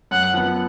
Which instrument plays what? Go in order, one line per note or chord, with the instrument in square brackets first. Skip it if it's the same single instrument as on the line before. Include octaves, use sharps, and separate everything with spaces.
[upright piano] F#2 [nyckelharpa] F#5
[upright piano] F3 B3